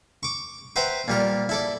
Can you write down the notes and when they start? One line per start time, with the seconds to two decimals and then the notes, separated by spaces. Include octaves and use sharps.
0.23 C#6 D6
0.76 B4 C5 E5 F#5 G5 A#5
1.08 A#2 G3 A#4
1.49 E4 A4 D5